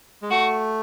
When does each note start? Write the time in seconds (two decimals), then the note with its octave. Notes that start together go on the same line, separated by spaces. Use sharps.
0.22 G#3
0.30 A3 F#4